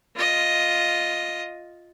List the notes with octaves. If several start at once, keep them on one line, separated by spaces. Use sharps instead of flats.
F4 D#5